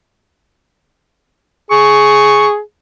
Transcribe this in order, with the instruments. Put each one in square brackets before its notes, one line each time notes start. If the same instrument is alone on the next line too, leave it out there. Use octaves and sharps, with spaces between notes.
[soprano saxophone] G#4 [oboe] C#6